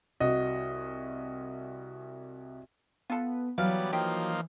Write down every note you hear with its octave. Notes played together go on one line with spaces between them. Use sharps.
C2 F#4 D#5
B3 F4 A4
E3 F#3 G3 B3 D5 F5
F3 A#3 D#4 G4